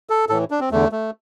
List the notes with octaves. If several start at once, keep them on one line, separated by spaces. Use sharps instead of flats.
A4
A2 E3 A4
D4
C4
E2 D3 A3
A3